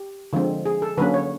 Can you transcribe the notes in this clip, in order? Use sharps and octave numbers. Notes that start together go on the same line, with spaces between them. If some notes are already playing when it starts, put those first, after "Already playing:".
Already playing: G4
D3 F3 G#3 C4
G#4
A4
D3 F#3 A#3 C#4 B4
C#5